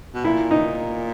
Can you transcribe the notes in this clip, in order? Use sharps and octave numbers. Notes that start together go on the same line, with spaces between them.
B2
A#2 E4
D#4